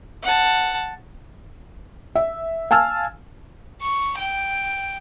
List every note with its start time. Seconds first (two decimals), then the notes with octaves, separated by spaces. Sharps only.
0.23 F#5 A5
2.15 E5
2.71 F5 G#5 A5 E6 F6
3.81 C#6
4.19 G5